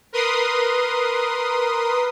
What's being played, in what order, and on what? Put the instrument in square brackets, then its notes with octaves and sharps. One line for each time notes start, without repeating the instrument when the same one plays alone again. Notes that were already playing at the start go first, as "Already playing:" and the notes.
[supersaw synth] A#4 B4 C6 D#6